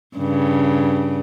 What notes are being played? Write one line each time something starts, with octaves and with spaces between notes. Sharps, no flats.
G2 C#3